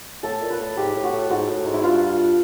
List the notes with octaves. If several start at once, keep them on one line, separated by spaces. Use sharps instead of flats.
A2 A4
A#2
B4
A2
G#2 G4
A2
F#4
A2
G#2 F#4
A2
G#2
E4
G2 F4